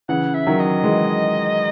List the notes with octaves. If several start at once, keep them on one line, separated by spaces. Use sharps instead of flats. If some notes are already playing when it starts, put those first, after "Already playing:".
C#3 E3 F#5
E5
D#3 F#3
D#5
E3 G#3